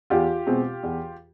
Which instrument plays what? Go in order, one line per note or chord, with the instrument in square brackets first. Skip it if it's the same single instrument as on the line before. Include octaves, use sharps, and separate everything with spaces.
[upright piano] E2 F4 G4
B2 G#3 C4
E2